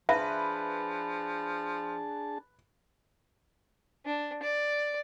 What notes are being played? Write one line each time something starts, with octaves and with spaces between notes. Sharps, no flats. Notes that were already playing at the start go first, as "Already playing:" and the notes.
F3 D4 G#4 B4 E5 A5
D4
D5